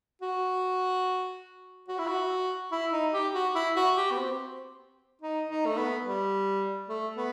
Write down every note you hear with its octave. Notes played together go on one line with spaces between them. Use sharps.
F#4
F#4
E4
F#4
E4
D#4
G4
F#4
E4
F#4
G4
B3
C4
D#4
D#4
A3
B3
G3
A3
B3